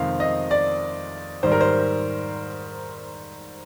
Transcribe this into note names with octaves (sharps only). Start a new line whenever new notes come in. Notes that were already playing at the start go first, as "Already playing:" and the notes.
Already playing: F2 C3 D#3 G#3 C4 F5
D#5
D5
G#2 D#3 G3 C5
A#4
C5